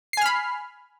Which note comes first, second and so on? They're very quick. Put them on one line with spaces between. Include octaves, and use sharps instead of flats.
C7 G#5 F6 B5